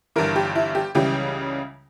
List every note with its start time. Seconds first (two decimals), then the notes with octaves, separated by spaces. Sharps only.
0.16 G1 G2 E3 A#4
0.36 G4
0.55 E4
0.75 G4
0.95 C#2 C#3 E3 G3 G4